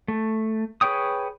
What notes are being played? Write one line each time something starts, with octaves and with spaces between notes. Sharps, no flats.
A3
G#4 B4 C#5 G5 D#6